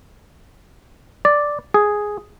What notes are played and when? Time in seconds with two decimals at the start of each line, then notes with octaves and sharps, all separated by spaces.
1.25 D5
1.74 G#4